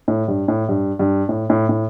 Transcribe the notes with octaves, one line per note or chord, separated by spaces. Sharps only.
A2
G2
A2
G2
G2
A2
A2
A2